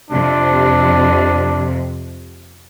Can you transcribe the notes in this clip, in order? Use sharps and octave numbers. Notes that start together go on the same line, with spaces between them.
F2 C3 D4